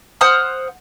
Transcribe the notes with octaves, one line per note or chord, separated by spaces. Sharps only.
C5 F#5 D#6 F6